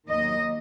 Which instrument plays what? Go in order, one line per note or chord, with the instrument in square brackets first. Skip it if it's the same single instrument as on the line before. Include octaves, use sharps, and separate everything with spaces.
[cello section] D#2 D#3 F#3 A#3 D#5